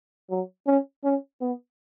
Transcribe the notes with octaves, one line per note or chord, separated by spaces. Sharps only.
F#3
C#4
C#4
B3